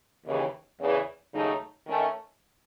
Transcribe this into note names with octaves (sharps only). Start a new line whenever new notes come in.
D#2 C#3 E3
E2 C#3 E3
D#2 C#3 F#3 A3 D#4
D#3 A3 C#4